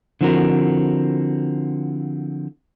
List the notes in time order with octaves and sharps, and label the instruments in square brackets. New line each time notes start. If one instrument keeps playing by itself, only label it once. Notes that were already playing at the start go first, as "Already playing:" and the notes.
[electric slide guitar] D3 F3 C4 E4 F#4 A#4